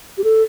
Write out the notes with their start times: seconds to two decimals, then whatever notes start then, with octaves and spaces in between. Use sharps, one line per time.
0.18 G4
0.24 A4